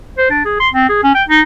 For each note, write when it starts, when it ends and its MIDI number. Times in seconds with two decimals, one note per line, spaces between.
0.18 0.28 72
0.30 0.40 62
0.45 0.59 68
0.60 0.69 84
0.74 0.88 60
0.89 1.01 68
1.03 1.15 61
1.15 1.23 79
1.28 1.42 63